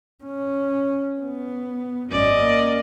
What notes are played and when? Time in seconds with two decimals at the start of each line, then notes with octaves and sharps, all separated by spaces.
0.24 C#4
1.19 B3
2.10 G#1 F#2 C#4 D5 D#5
2.40 A#3